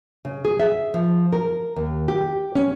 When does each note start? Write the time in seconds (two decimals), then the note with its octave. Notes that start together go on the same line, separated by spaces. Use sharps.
0.25 C#3
0.45 G#4
0.60 E5
0.94 F3
1.33 A#4
1.76 D#2
2.08 G4
2.55 C#4